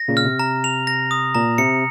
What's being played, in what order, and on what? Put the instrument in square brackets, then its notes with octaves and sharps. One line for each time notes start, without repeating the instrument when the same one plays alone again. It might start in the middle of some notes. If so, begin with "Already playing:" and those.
Already playing: [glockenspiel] A#6
[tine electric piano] A#2 C#3
[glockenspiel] F6
[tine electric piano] C3
[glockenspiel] A#5
F7
A#6
D#6
[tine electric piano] A#2 [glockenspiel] A#5
[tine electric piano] C3 [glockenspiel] C#7